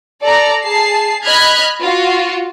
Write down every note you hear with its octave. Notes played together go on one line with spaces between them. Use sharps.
A4 D5 A#5
G#4 A5 C7
D#5 B5 F6 F#6 G#6 B6
F4 F#4